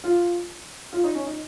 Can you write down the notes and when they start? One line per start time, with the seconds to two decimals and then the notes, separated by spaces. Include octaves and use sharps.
0.04 F4
0.93 F4
1.04 D#4
1.15 C#4
1.26 D#4